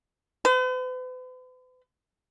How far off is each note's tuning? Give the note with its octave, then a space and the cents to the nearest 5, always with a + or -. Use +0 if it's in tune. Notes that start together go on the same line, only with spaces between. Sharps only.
B4 +45